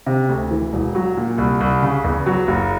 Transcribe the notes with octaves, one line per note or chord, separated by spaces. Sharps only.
C3
D2
E3
E1
F#3
A#2
C2
C2
C#3
E2
F#3
F#1